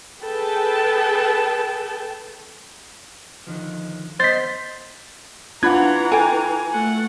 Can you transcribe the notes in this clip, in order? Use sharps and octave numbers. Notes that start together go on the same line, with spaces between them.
G#4 A4 B4 G5 A5
D3 D#3 F3
B3 C5 D5 D#5 A6 B6
E3 D4 F4 F#5 A#5 B5 G#6
A4 G5 G#5
A3 F#5